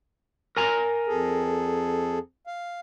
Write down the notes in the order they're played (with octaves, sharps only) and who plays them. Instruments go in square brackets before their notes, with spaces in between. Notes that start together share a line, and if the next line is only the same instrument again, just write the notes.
[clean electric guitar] A#4 G#5 A#5
[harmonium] F2 G#4 A4
F5